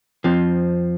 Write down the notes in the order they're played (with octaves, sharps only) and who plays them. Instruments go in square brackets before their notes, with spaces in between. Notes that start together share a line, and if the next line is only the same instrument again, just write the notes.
[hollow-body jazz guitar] F2 F3 C4